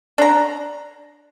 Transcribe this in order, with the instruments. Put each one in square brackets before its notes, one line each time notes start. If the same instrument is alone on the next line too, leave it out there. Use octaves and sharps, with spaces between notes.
[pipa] D4 A#5